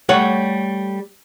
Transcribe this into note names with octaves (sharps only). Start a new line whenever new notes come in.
G3 A3 C#5 F#5